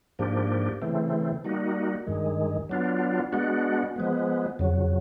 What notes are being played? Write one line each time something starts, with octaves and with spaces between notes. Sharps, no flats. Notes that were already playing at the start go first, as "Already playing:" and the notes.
G#2 F3 A#3 D4 G4
C#3 E3 A3 C4
G3 A#3 D#4 F#4
G2 D#3 G#3
F#3 B3 D4 F4
G#3 B3 D4 F#4
F3 G#3 B3
F2 C#3 F#3